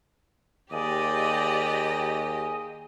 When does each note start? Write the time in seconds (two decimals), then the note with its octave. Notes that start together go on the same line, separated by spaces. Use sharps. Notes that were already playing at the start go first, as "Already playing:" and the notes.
0.72 D#2 G4 G#4 D5 D#5 G#5